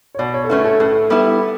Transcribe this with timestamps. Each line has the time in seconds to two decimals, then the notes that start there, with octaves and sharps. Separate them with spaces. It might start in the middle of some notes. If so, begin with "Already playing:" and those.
0.15 C#5
0.19 B2 D5
0.34 C#5
0.44 A4
0.49 A3 C#4 E4 B4
0.64 A4
0.80 A2 A4
1.10 G3 B3 E4